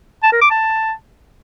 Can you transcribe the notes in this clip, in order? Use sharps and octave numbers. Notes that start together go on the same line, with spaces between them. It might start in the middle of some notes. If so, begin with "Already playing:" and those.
A5
A#4
D6
A5